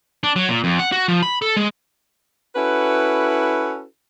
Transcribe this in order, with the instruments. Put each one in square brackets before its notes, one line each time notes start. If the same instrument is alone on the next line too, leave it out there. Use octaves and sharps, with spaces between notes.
[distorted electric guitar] D4
F#3
A#2
F2
F#5
F#4
F3
B5
A4
G#3
[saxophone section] C#4 E4 F#4 A4 B4